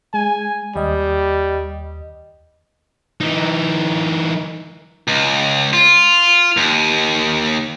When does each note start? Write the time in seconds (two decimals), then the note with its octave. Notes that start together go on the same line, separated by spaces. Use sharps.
0.14 G#3 G#5
0.76 D#2 G3 D#5
3.21 E3 D#4
5.08 C#2
5.73 F4
6.57 D#2